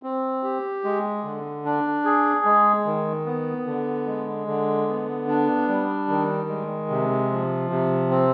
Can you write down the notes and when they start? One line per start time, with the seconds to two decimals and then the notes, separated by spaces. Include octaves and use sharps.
0.03 C4
0.43 G4
0.84 G#3
1.24 D3
1.65 D4
2.05 G#4
2.45 G#3
2.86 D#3
3.26 B3
3.67 D3
4.07 G#3
4.47 D3
4.88 B3
5.28 D4
5.68 G3
6.09 D#3
6.49 G#3
6.90 C3
7.31 F3
7.70 C3
8.11 C4